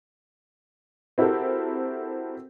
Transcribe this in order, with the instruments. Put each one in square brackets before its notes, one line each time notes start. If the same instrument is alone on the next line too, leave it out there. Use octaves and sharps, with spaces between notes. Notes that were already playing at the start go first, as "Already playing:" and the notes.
[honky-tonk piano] C4 E4 F#4 G4 A4 A#4